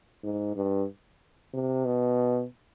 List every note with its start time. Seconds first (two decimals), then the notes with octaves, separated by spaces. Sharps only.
0.24 G#2
0.56 G2
1.54 C3
1.86 B2